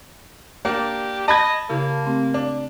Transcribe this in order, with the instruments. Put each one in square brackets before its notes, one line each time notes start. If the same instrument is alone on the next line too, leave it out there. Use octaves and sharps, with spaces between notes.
[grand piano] A#3 D4 D5 [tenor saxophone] G4
[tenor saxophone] D#5 [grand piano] A5 B5 G#6
[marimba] C#3 E4 G4 [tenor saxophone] A#3
[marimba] A3 C4 G4
[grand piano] D4